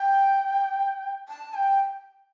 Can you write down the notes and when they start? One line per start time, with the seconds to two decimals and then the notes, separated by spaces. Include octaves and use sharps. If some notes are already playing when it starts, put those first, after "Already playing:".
Already playing: G5
1.29 A5
1.54 G5